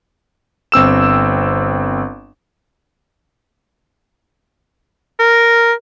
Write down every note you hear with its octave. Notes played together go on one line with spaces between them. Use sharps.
G1 C4 E6 E7
A#4